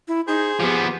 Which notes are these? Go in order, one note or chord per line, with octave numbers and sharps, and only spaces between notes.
E4
D#4 G#4 C5
F3 B3 G4